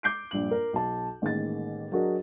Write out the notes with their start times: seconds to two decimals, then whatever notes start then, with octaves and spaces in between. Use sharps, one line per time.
0.03 D6 G6 C7 D7
0.31 A#1 G2 F#7
0.51 A#4
0.73 B1 A5
1.22 A1 D#3 G#3 A#3 A6
1.92 F#3 D4 F#4 G#4 A#4 D#5